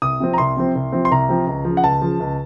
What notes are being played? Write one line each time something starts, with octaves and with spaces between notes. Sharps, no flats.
C2 D#6
C3 F3 C4
A#5
C2 C6
C3 F3 C4
C2
C3 F3 C4
C6
C2 A#5
C3 F3 C4
C#2
C#3 F3
F#5
C#2 A5
C#3 F3
C#2